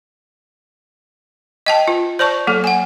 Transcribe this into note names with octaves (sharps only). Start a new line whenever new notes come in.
D#5 G5 A5
F4
C5 D5 A5 C#6
F#3 A#3 A4
F#5 G#5